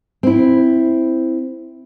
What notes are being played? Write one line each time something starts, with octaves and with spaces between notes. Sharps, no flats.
C4 E4